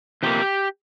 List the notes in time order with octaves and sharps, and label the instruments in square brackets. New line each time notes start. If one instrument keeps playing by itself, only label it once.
[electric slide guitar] C3 F3 A#3 G4